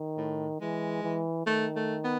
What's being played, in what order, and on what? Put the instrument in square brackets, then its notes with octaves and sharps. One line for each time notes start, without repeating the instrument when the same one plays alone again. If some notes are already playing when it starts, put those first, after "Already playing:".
Already playing: [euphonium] D#3
[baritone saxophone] A2
[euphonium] E3 [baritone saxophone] G#3
[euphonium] E3
[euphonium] D#3 [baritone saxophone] A3
[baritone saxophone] A3
B3